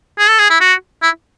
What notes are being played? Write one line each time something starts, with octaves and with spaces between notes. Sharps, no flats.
G#4
A4
G#4
E4
F#4
E4